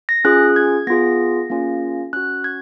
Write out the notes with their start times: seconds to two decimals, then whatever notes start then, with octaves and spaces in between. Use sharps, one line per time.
0.09 A#6
0.25 C#4 F4 G#4 F#6
0.56 G#6
0.87 B3 F4 G#4 A#6
1.50 A#3 C#4 F4 G#4
2.13 C#4 F#4 F#6
2.44 G#6